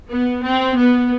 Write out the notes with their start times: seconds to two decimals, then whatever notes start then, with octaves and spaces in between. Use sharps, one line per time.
0.11 B3
0.44 C4
0.77 B3